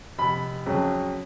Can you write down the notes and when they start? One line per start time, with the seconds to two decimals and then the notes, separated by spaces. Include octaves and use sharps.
0.18 F1 B5
0.66 F2 C#3 F#3